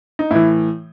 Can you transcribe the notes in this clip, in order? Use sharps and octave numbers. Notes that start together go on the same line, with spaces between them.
D#4
A2 E3 E4